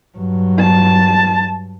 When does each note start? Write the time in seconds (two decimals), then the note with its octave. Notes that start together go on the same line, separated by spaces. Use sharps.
0.18 G2 F#3
0.59 A5